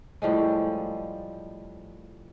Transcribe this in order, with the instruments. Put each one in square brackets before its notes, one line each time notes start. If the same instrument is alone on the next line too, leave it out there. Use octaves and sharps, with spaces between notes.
[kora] A2 F3 G3 G#3